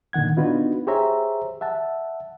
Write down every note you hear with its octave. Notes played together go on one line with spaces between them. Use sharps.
A#2 D3 D#3 F#5 G#6
B3 D4 D#4 F4 F#4 B4
G4 G#4 C5 C#5 E5 A#5
E5 F#5 A5